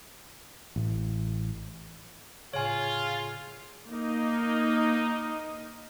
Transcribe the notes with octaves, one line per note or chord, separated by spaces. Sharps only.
A1
A2 C#3 F4 G#4 C#5 G#5
A#3 D#4 D#5